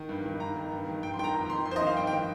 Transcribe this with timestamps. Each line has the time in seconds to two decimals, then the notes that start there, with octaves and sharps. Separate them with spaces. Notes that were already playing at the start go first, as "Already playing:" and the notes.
Already playing: D#3
0.09 G2
0.25 D#3
0.40 G2 A#5
0.56 D#3
0.72 G2
0.87 D#3
1.02 G2 G5
1.14 C6
1.19 D#3 G5
1.24 A#5
1.34 F2 A#5
1.50 D#3 C6
1.65 F2 C6
1.71 C5
1.76 D#5
1.81 D#3
1.87 F5
1.97 G2 G5
2.07 G5
2.12 D#3